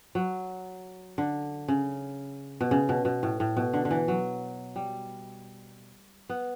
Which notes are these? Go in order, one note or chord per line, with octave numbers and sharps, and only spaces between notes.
F#3
D3
C#3
B2
C#3
B2
B2
A2
A2
B2
D3
D3
E3
F#3
G3
B3